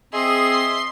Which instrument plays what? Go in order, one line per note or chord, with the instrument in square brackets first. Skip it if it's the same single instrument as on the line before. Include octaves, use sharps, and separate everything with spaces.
[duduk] C4 [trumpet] G#4 [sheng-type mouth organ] D#5 E5 [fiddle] C6